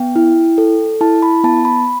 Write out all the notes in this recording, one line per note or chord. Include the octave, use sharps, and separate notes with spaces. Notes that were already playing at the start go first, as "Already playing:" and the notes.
Already playing: B3 G5
E4
A4
E4 A5
B5
B3 A5
B5